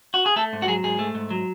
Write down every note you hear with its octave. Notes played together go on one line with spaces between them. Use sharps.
F#4
G#4
A3 A4
G#2
F#4
F#3 G#4
G#2 G#4
A3
G#2
F#3